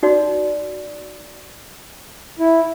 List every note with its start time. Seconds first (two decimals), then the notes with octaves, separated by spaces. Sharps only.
0.03 D#4 F#4 D5
2.39 E4